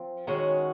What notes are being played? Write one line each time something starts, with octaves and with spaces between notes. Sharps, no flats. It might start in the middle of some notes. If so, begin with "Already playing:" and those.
Already playing: F3 C4
D#3 G#3 C#4 F#4